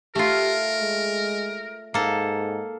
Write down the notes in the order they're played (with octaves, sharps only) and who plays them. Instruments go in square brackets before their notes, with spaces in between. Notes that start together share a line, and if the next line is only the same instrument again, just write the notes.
[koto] A3 F4 [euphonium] G4 [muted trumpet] A#4
[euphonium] G#3
[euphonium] G#2 [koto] A#3 A4